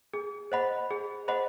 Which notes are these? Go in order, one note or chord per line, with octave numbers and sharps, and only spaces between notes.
G#4
C5 D#5 F#5 B5
G#4
C5 D#5 F#5 B5